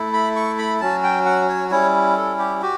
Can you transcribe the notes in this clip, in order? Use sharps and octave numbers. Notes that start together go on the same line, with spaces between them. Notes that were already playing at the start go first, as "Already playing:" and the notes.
Already playing: A3 E4
B5
C#6
B5
F#3 C#4 F#4 A5
G5
F#5
C#5
G3 C#4 E4 C#5
A4
G4
F#4 G4